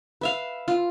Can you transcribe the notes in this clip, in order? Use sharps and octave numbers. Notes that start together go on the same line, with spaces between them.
B4 E5 F5
F4